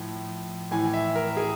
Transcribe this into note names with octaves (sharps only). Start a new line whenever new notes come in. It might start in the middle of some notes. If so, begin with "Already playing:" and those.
Already playing: A2 F3
A2 E3 G#5
E5
A#4
G#4